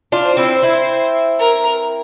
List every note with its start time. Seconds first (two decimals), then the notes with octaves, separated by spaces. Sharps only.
0.12 D4 F4
0.25 C5
0.37 C4 E4
0.62 C4 E4
1.39 A#4